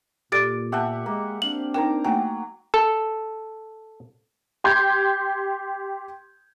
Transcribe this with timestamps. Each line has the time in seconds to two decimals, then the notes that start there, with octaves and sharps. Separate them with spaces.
0.32 A#2 G4 A4 D5 D6 A6 D7
0.72 B3 G4 E5 F#5 A5
1.06 G#3 A#3
1.42 C4 D4 F5 F#7
1.74 D#4 A#4 G5 A#5 D6
2.05 F#3 A3 A#3 G5 G#5
2.74 A4
4.64 G4 C6 G6 G#6